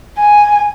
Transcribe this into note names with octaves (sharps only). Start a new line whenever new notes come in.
G#5